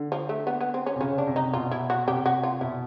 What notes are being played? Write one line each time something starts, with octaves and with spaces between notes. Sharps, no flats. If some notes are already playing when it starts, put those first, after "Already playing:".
Already playing: D3
F3
A3
B3
B3
C4
C#4
C3
C#3 C#4
D4
C3
D#4
B2 F4
E4
F#4
C3 G4
F#4
F4
B2 E4